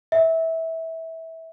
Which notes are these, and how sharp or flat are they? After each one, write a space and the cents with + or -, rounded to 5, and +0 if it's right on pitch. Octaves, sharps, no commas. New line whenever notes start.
E5 -20